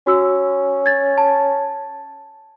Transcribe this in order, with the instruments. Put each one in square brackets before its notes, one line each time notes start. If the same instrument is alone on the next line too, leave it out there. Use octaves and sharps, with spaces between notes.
[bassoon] C#4 [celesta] F#4 E6
[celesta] G#6 A6
A5